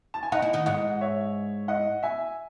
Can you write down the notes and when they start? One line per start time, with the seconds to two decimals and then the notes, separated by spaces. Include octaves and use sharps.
0.14 A5
0.23 G#5
0.32 D#4 D#5 F#5
0.42 E4
0.53 D#3 D#4
0.66 G#2 G#3 D#5 F#5
1.01 C#5 E5
1.68 D#5 F#5
2.03 E5 G#5